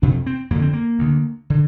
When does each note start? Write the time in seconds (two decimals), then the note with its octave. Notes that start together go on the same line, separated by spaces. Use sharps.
0.02 F2 C3 D4
0.26 C4
0.51 F2 D3 A#3
0.62 C4
0.73 A#3
0.99 D2 D3
1.50 D3